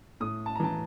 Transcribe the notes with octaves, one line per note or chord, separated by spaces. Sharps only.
A2 D#6
A5
A#5
E3 A5